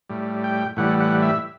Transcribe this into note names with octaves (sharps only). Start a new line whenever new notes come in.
A2 G3
G5
A2 E3 G3 F#5
F#5
E5